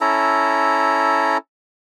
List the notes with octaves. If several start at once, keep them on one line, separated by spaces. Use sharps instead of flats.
C#4 E4 A4 A#5